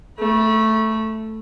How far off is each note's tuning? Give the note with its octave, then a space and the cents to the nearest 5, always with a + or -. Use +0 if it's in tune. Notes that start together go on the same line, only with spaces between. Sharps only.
A3 +0 B5 -35